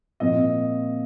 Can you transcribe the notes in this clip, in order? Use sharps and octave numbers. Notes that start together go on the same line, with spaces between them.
A#2 F3 C4 D#5